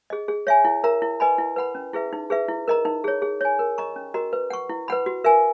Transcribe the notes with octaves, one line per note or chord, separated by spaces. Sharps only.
G#4 D#5
G#4
C#5 E5 G#5
E4
A#4 E5 A#5
E4
B4 D#5 G#5 B5
E4
B4 F#5 B5
C#4
E4 G#4 B4 E5
D#4
G#4 B4 E5
E4
A#4 D#5 A#5
D#4
G#4 C#5
G#4
C#5 G#5
A#4
D#5 A#5 C#6
C#4
F#4 A#4 D#5 A#5
B4
F#5 C#6
E4
B4 F#5 B5
F#4
A#4 E5 G#5